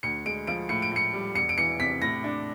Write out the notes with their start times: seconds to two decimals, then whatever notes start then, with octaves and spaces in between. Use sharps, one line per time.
0.03 D2 C#7
0.26 G#3 D7
0.47 F3 D7
0.69 A2 C#7
0.82 D7
0.92 A2 C#7
1.14 G3
1.35 E1 C#7
1.49 D7
1.58 E3 C#7
1.79 C3 B6
2.02 A2 A#6
2.24 D4